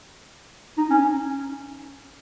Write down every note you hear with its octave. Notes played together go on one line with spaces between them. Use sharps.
D#4
C#4